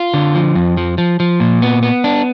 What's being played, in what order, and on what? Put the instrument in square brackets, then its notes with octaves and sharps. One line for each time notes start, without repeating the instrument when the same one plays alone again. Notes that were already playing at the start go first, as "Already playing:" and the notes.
Already playing: [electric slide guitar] F4
D3
F3
F2
F3
F3
F3
A#2
B3
B3
D4